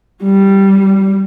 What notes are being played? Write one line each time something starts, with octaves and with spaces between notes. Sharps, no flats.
G3